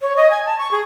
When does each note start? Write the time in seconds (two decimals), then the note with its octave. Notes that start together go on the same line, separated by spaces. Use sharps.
0.01 C#5
0.16 D#5
0.30 G#5
0.46 A5
0.58 C#6
0.71 G#4